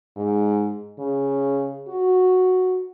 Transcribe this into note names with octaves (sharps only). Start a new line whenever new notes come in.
G#2
C#3
F#4